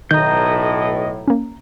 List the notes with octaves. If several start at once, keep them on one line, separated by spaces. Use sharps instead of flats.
B1 A2 D#3 D#5 A#5 G6
A#3 C#4